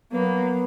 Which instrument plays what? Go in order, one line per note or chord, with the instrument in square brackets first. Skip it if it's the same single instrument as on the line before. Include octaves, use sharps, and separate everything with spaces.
[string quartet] F#3 A#3 [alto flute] B3